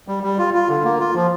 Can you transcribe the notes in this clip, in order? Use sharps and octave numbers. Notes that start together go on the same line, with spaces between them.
G3
G3
F4
F4
D3
A#3
F4
F3